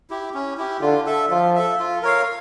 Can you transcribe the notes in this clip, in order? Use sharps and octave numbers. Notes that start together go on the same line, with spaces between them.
E4 G4
C#4
E4 G4
D3 F4
A4 E5
F3 F4
A4 E5
F4
A#4 C#5 F5